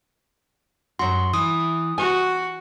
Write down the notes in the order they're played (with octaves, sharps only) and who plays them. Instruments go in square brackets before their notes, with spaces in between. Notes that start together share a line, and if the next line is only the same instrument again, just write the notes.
[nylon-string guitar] F#2 F#4 [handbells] C6
[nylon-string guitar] E3 [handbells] D#6
[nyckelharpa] F#4 [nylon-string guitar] G#5